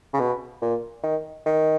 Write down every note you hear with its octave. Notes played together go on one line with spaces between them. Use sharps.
C#3
B2
A#2
D#3
D#3